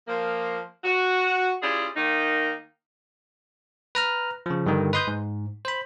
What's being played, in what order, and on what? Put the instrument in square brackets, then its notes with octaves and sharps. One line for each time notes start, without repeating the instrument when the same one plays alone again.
[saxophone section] F3 A#3
F#4
C#4 E4 F4 G4 G#4 D5
D#3 A#3 D#4
[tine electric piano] B4 A#5 F6
C#3 F3
G2 D3 D#3
B4 D#5 C6 D#6 G6
G#2
C5 B5